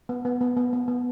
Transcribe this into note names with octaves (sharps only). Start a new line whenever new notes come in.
B3
B3
B3
B3
B3
B3